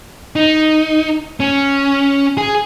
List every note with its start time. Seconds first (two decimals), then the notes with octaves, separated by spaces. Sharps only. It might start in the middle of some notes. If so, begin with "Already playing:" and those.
0.36 D#4
1.40 C#4
2.37 G#4